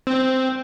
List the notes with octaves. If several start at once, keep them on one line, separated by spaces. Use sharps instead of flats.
C4